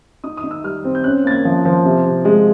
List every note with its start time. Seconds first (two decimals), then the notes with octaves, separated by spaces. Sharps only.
0.24 D#4 D#6
0.37 D#6
0.44 D#4
0.51 E6
0.64 G3 F6
0.84 C4
0.95 G6
1.04 C#4 F#6
1.24 A#3 A6
1.31 G#6
1.45 F3
1.65 F3
1.85 C3
2.05 C3
2.25 G#3